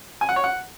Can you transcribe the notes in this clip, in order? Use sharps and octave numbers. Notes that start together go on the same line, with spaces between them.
G#5
F#5
C#5
F#5